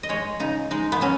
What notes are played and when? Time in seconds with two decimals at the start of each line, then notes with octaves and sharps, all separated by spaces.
0.03 D#5
0.09 G#3 C#5
0.40 C#3 D#4
0.71 G#3 D#4
0.92 B3
1.01 F#3 C#4